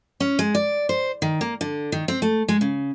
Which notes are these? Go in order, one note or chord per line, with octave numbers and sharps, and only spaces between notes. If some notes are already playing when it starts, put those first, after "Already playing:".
C#4
G#3
D5
C5
D#3
A#3
D3
D#3
C4
A3
G#3
C#3